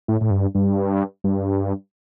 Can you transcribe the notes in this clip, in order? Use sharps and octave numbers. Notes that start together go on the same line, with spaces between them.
A2
A2
G2
G2
G2